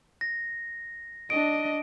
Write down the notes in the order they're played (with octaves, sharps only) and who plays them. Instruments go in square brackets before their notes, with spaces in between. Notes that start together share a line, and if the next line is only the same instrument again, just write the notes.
[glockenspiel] A#6
[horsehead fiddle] D4 D#5 [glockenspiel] D7